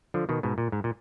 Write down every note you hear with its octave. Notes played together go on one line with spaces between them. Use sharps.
D3 F3
B2 D#3
G#2 B2
A#2
G#2
A#2